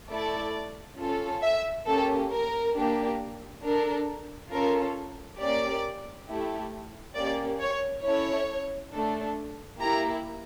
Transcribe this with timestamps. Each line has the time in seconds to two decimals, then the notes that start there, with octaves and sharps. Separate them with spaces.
0.10 A3 E4 A4 D5
0.99 C#4 F4 A4
1.43 E5
1.87 A#3 C#4 G4 A4
2.31 A#4
2.76 A#3 D4 G4
3.63 D4 A4 A#4
4.51 C#4 F4 A4 A#4
5.40 A#3 C#4 G4 D5
6.28 A3 E4 G4
7.16 A#3 C#4 G4 D5
7.60 C#5
8.04 C#4 E4 A4 C#5
8.92 A3 D4 A4
9.80 A#3 E4 G4 A#5